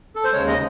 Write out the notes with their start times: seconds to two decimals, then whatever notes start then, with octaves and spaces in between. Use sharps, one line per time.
0.16 A4
0.24 C5
0.32 D#2 C#3 G#3 C#5
0.47 D#5